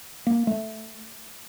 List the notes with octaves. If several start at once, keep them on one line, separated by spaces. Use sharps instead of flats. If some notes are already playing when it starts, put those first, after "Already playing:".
A#3
A3